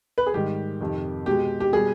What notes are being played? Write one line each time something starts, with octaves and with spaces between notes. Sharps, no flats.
B4
G#4
G#2 D#3 G3 G4
F2 C3 D#3
B2 G#3 G4
G4
B2 G3 G#4